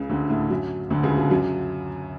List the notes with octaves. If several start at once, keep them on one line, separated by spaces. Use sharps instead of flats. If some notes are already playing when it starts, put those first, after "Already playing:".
Already playing: C#2 C#3
D2 D3
A2 A3
F#2 F#3
D2 D3
C#2 C#3
B2
F#2 F#3